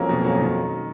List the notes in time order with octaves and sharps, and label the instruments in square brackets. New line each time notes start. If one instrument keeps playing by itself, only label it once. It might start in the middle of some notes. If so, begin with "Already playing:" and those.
Already playing: [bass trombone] F2 [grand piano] F#3 A#3 C#4
[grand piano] B2
F#3 A#3 C#4
D#3